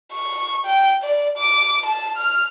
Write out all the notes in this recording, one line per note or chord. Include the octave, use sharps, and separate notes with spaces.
C#6
G5
D5
D6
A5
F6